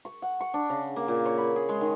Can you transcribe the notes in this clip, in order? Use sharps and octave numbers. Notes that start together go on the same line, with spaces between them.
C#6
F#5
C#6
D4
C#3
A#3
A#2
C#5
B5
G#4
G#3
D#3